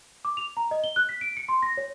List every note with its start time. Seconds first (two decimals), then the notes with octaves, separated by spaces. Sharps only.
0.25 D6
0.37 F7
0.57 A#5
0.71 D#5
0.84 G7
0.96 F#6
1.09 B6
1.21 D7
1.37 C#7
1.49 C6
1.62 A#6
1.77 C#5